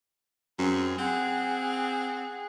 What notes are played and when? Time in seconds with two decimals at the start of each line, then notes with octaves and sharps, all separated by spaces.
0.59 F#2 C4 G#4
0.98 C4 G#4 F#5